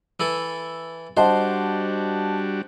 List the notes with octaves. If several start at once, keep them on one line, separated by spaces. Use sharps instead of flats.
E3 E4 A4
G3 D4 F#4 C5 D#5 F#5 A5